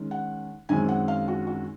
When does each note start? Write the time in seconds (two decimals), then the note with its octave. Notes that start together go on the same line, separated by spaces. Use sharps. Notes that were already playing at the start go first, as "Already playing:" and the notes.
Already playing: D#3 G#3 C#4
0.11 F#5
0.69 F#2 D#3 G#3 C4 G#5
0.89 F#5
1.08 F5
1.28 F#4
1.47 F#4